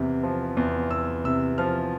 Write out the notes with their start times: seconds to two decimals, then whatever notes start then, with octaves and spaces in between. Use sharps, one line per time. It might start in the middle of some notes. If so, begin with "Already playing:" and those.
Already playing: E2 C3
0.23 F3
0.57 E2
0.91 E2 E6
1.24 C3 E6
1.58 F3 F6